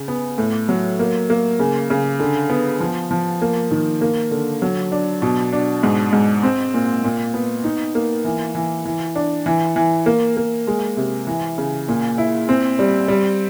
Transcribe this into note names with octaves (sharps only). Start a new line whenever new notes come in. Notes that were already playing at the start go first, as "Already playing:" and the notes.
Already playing: C#3
B3
A2
F#3
A#3
A#3
C#3
C#3
D3
B3
F3
F3
A#3
D#3
A#3
D3
F#3
D4
B2
D4
G#2
G#2
C4
A#2
A#2
B3
D#4
A#3
E3
E3
E3
D4
E3
E3
A#3
A#3
G#3
C3
E3
C#3
A#2
E4
C4
G3
G3